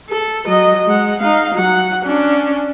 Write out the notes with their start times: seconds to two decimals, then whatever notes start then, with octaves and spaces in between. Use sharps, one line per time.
0.10 A4
0.46 F#3 D#5
0.87 G#3 F#5
1.19 D#4 F5
1.55 F#3 F#5
2.05 C#4 D4